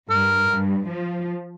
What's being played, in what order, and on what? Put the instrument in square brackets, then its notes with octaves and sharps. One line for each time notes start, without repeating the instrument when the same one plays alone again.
[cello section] G2 [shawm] A#4
[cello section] G2
F3